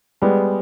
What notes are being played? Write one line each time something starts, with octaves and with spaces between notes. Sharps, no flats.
G3 G#3 B3